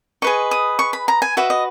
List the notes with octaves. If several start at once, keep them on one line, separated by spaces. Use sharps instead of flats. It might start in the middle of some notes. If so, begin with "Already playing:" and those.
G#4 B4 D#5 C#6
D#6
C#6
B5
A#5
G#5
F#4 B4 D#5 E5
D#5